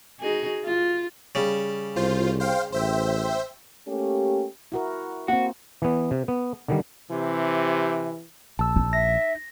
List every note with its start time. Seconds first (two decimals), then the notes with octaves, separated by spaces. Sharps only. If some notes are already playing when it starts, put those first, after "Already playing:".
0.20 D#4 F#4 G#4
0.65 F4
1.35 C#3 G3
1.96 C2 F4 C5
2.40 C5 F5 G5
2.72 A1 C5 E5 G5
3.87 A3 A#3 C#4 G4
4.72 E4 F#4 A#4
5.28 A#3 C4 F#4
5.82 E3 B3
6.11 C3
6.28 B3
6.68 D3 D#3 G3
7.10 C3 E3
8.59 A#1 A5 E6
8.76 D#4
8.93 E5 A#6